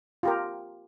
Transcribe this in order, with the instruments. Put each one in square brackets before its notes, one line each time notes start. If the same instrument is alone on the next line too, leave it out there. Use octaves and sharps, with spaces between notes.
[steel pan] F4 G4 A#4